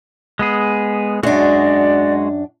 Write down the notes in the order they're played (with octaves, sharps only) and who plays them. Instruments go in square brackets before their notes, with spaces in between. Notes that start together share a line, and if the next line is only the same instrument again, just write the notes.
[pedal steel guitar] G#3 B3 G#4
[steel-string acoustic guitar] F#2 D4 [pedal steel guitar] G#3 F#4 [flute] D5